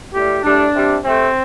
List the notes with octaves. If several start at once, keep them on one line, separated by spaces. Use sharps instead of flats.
A2 G3 G4
A2 G3 D4
C3 G3
C3 A3 C4